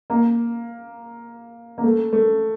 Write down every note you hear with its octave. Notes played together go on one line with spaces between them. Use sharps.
A#3
A#3
A3
A3